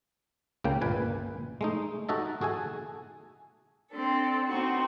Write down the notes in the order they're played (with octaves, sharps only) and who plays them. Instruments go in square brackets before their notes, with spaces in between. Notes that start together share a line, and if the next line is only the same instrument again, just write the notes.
[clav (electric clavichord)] C#2 C#3 A#3 G5
G1 A#2 B4 G#5
G#3 A3 D#4
D#4 F#4 A4 D#5 E5 A5
F#4 G#4 A4 G#5
[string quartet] C4 D4 A4
B3 C4 D#4 F#4